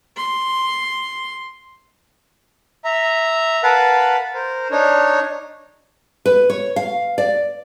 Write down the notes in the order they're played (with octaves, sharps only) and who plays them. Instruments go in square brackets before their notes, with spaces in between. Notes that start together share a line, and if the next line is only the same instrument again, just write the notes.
[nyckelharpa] C6
[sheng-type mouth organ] E5 A#5
A#4 B4 F5 F#5 A5 B5
A#4 C5
D4 D#4 C#5
[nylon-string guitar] B4
C#5
F5
D5